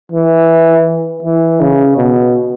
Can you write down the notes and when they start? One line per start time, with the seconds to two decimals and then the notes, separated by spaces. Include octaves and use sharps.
0.12 E3
1.23 E3
1.60 C#3
1.97 B2